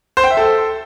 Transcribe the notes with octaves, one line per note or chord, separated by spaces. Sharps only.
C5
G5
E5
A4